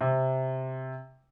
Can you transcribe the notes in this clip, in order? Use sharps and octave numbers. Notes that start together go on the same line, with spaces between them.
C3